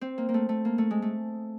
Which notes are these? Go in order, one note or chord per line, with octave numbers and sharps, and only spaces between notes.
C4
A#3
A#3
A3
A3
A#3
A3
G#3
A3